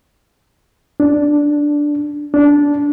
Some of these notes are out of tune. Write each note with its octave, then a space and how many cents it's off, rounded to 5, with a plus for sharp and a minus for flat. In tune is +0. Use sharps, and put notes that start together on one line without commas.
D4 -5
D4 -15